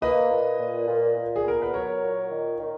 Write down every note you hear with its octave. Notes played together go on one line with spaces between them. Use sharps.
A#3 B4 D#5
A#2
A#2
A#2
A#2
G#4
B3 A#4
B4
F#3 A#4 C#5
A#2
D#3
D#3